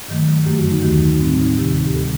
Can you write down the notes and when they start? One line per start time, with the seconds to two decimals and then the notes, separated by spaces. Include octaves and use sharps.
0.08 G2 D#3 F#3 A3
0.45 F#2 D3 F#3 A3 G4
0.58 F#4
0.71 D#4
0.83 D#2 D#3 A3 F#4
1.02 D#4
1.20 A2 G3 C4
1.39 D#4
1.58 D2 C3 D#3 G4
1.86 G4
1.95 D3 G3 A4